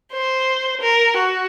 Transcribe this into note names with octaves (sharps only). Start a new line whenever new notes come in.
C5
A#4
F#4